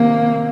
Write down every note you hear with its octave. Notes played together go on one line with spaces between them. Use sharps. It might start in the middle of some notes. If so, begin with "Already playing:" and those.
Already playing: C3 D#3 A#3